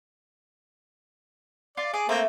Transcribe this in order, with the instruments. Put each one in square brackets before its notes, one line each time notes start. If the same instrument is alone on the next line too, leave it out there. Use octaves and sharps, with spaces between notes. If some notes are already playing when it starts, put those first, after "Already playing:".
[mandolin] F4 [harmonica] D5
[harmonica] G#4 [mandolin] D5
[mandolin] A3 [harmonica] A#3 C4